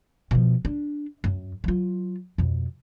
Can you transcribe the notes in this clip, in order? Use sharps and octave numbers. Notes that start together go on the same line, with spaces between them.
B2 F3
D4
F#2
F#3 F4
F2 B2